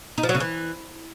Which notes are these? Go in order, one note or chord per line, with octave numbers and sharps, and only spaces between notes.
D#4
F3
F#3
C#3
E3